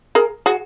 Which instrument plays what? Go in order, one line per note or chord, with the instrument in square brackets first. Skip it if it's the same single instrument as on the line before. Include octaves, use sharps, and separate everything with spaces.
[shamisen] G#4 A#4
F#4 G#4